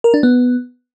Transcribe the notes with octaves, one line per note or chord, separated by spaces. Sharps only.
A#4
D4
B3